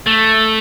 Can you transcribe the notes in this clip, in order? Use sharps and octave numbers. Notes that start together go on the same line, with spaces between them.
A3